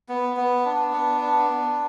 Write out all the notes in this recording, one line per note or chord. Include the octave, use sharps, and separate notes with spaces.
B3
B3
D4
B3
D4
B3